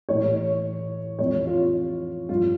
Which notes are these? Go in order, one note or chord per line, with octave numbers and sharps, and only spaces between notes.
A2 E3 C#5
F2 E3 C#5
F4
G2 F3 F4